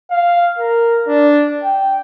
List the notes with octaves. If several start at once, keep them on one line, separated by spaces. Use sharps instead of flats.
F5
A#4
D4
G5